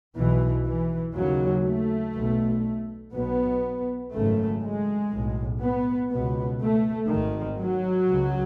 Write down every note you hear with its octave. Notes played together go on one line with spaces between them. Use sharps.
B1 B2 E3
E3
D#2 C#3 F#3
A3
B1 B2
B1 B2 B3
G#1 F#2 C#3 A3
G#3
B1 A2
B3
C#2 B2 B3
A3
G#1 G#2 D#3
F#3
C#2 C#3